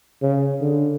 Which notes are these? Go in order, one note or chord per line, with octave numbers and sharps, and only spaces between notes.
C#3
D3